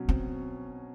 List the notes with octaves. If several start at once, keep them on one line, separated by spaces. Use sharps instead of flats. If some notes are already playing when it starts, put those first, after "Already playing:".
Already playing: B2 F#3 C#4
C4